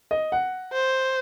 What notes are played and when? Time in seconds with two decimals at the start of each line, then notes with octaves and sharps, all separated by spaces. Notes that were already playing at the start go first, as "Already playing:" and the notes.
0.11 D#5
0.32 F#5
0.73 C5